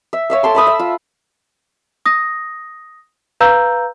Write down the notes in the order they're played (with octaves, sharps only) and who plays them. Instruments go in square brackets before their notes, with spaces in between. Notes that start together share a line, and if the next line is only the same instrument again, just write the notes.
[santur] E5
C#5 E5 F5
A4 A5 C6 D6
E5 B5 D#6 E6
E5
F4
[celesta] D#6 A#6
B4 F5 A#5 E6 G6